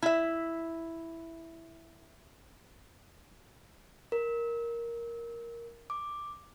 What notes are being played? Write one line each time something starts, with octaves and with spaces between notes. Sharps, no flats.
E4 E5
A#4
D6